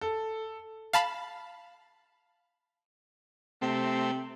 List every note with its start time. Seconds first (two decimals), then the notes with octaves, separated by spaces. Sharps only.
0.01 A4
0.93 F5 A5 B5
3.62 C3 A3 C4